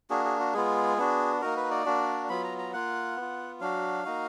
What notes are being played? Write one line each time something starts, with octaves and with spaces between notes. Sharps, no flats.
A#3 D4 F#4 G#4
G#4
F#4
G#3 B3 F4 G#4
B3 D4 F#4
A#3 D#4 F#4 A#4
B4
D5
A#3 D4 F#4
F#3 B3 F4 B5
A#5
A#5
A#3 F4 F#5
B3
F4
F#3 D4 F#4 F5
A#3 D#4 F#4